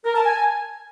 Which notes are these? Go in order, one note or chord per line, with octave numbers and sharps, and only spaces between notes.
A#4
A5
G#5